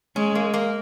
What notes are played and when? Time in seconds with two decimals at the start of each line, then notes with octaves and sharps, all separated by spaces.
0.16 G#3 C#4
0.35 A#3
0.54 A#3